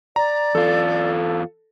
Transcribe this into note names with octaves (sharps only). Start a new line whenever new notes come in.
D5 A#5
E2 F4 A4